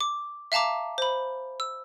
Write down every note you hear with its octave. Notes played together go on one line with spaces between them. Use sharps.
D6
E5 F5 A5 A#5 D6
C5 B5
E6